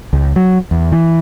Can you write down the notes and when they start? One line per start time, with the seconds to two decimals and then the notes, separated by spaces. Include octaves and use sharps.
0.13 C#2
0.36 F#3
0.71 E2
0.92 E3